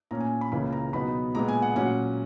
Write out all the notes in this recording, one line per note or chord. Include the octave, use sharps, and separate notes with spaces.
A#2 A#3 C#4 A#5
G#5
B5
C#2 C#3 E3 A#3 B5
A#5
B2 F#3 B3 D#4 B5
A#2 G#3 B3 A#5
G#5
F#5
A#2 F#3 C#4 F#5